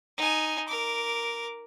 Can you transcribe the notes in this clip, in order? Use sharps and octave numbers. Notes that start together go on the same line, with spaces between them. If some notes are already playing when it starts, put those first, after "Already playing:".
D#4 G#5
A#4 D6